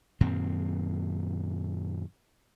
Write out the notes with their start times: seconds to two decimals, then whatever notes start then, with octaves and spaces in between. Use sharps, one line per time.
0.21 F#2 A#2 D#3 C4